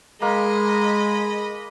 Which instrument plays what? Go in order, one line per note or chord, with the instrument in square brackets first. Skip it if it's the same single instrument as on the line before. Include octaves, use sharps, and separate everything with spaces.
[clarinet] G#3 [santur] A#3 [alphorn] G#4 [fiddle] D#5 B5